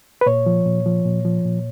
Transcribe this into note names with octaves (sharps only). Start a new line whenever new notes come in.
B4
A#2 C#5
F3
A#2
F3
A#2
F3
A#2